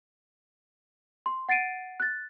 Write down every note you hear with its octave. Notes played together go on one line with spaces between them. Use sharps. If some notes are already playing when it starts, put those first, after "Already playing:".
C6
F#5 A6 C7 D7 D#7
F#6 A6